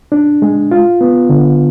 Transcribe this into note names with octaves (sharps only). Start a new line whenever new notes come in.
D4
G#3
F4
B3
D3